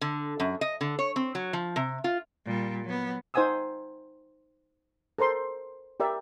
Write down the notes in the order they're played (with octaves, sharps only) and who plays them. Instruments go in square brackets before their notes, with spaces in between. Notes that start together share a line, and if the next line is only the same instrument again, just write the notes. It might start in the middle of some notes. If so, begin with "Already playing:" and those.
[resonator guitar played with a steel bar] D3
F#2
D#5
D3
C#5
C4
F#3
F3
C3
F4
[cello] A#2 G3
F#3 B3
[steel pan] D#4 C5 F#5 G#5 D#6 E6
A4 A#4 C5 C6
G4 A#4 D5 E5